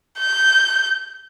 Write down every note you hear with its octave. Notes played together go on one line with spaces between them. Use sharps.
G6